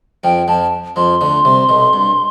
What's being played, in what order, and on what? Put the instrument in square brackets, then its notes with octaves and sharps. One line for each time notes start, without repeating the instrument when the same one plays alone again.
[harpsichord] F2 F3 [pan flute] G5
[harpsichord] F2 F3 [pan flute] A5
[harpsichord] F2 F3 [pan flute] C6
[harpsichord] D2 D3
C2 C3
B1 B2
G2